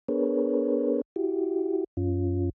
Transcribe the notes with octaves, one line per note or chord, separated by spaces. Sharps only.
B3 D4 G#4 A#4 B4 C#5
E4 F#4 G4
F#2 C#4 F4